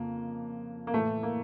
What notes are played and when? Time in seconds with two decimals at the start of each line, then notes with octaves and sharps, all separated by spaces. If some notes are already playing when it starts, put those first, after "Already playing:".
Already playing: F2 C#3 A#3
0.87 A#3
0.94 A2 E3 A3
1.23 A#3